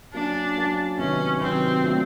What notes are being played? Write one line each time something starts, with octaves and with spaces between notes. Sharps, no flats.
F#3 A#3 C#4 D4
F#3 A#3 C#4
C3 D#3 F#3 B3 C#4 E4
C3 D#3 F#3 B3 C4 E4
A#2 F#3 A3 D4 F4